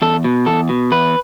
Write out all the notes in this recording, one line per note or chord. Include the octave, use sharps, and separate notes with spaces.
E2 A4
B2
E2 A4
B2
E2 B4